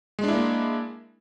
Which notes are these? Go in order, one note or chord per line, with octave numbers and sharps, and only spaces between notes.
G#3 A#3 D4 E4